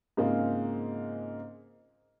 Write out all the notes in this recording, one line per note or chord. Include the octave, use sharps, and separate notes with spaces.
G#2 C#3 A#3 C4 F4 G#4